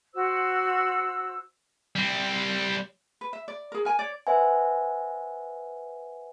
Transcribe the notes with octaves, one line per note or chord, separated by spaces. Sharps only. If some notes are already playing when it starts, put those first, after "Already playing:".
F#4 C5 E6
G3 C4
B4
E5
D5
G#4 A#4
A#4 G#5
C#5 D5
B4 C5 E5 F#5 G#5